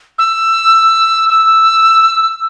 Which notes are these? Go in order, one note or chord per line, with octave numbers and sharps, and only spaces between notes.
E6
E6